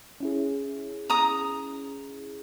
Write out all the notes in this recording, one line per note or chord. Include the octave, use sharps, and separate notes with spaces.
C#4 E4 G#4
A#5 D#6